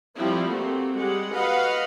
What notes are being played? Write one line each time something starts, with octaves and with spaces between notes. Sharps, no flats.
F3 G3 C4 E4
A3 A#3 C4 F#4 G4
G3 G#3 G4 F#5
F#4 B4 D#5 F5 F#5